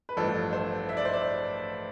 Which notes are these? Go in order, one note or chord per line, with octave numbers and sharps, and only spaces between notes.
B4
A1 G2 F3 A4
C5
E5
D5
C5
D5